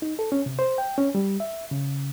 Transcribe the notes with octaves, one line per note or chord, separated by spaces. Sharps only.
D#4
A4
C#4
C3
C5
G5
C#4
G3
E5
C#3